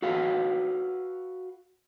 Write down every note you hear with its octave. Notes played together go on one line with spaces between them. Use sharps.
F#4 A4 B4 F5